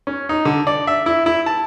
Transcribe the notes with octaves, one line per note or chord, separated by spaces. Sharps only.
C#4
D#4
D3
D5
E5
E4
E4
A5